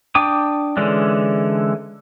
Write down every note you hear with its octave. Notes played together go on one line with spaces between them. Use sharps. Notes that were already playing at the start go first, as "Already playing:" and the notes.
D4 G5 D6 D#6
D3 E3 G#3 C#4 D4